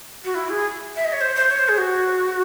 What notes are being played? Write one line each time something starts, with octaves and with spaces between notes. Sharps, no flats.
F#4
E4
G#4
E5
D#5
C#5
C5
C5
C#5
C5
G#4
F#4